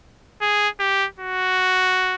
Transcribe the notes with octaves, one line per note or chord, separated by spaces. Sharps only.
G#4
G4
F#4